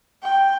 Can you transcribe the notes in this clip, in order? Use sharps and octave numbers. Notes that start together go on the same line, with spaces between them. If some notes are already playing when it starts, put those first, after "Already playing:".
G5